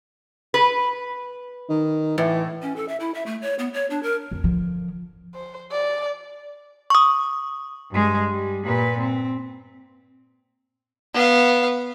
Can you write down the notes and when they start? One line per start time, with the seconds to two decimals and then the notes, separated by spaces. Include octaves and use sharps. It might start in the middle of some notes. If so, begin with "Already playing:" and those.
0.54 B4
1.69 D#3
2.18 A2 E3
2.62 C#4
2.76 A4
2.88 E5
3.00 E4
3.14 E5
3.26 A3
3.42 C#5
3.59 B3
3.73 C#5
3.90 D4
4.03 A#4
4.31 F2
4.44 D3 F3
5.35 C5
5.72 D5
6.90 C#6 D#6
7.91 G2 G#3
8.31 G3
8.65 A#2 B4
8.99 C4
11.14 B3 F5